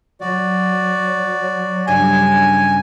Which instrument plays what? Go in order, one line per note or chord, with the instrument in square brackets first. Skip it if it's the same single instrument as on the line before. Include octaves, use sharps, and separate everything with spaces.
[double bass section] F#3 [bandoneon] F#4 D5
[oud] G2 C#3 D4 [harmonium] G#5